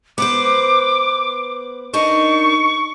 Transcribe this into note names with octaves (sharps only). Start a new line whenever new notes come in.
B3 B4 C5 D6
D4 D#4 A#4 C#6